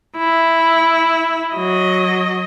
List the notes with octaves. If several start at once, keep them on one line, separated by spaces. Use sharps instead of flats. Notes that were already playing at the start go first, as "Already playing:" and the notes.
E4
F#3 D#5